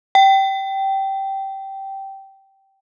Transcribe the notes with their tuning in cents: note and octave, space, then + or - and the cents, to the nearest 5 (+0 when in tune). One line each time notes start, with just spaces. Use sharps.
G5 -15